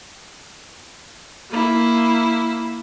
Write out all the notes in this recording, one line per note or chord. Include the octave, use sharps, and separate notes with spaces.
A#3 E4